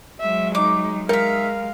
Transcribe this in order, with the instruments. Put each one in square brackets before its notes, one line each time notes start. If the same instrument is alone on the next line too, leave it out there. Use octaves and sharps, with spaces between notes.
[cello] F#3 G#3 [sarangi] E5
[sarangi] D#4 [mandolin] D6
[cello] G#3 [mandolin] D#4 E5 [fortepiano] A#4 [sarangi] F5